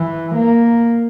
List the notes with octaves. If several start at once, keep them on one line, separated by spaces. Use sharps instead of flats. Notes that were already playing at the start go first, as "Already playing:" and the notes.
Already playing: E3
A#3